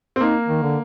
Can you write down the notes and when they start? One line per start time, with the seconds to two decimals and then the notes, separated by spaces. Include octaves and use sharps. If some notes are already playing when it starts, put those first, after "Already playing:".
0.16 C4
0.21 A#3 D#4
0.48 D#3
0.63 D3